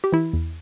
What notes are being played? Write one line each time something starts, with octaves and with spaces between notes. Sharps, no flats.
G4
E3 E4
E2